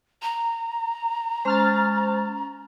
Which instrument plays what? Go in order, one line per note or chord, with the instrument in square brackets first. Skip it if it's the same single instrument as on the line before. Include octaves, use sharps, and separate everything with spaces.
[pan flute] A#5
[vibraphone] G#3 C#4 [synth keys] C5 F6 A6